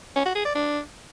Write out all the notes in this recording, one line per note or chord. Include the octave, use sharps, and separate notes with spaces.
C#4
F#4
G#4
D5
D4